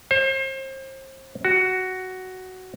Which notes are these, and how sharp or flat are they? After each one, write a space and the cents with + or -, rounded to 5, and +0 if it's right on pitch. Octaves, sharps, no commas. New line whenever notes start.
C5 +35
F#4 +10